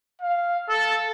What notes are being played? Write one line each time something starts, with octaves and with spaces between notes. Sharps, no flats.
F5
A4